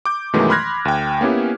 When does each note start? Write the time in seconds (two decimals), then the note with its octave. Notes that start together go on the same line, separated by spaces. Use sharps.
0.05 D6 G6
0.33 F#2 B2 D#3 E3 G#3 A3
0.50 B5 C6 F6 F#6 G#6 A#6
0.85 D2 G5
1.21 A#3 B3 C#4 E4 G4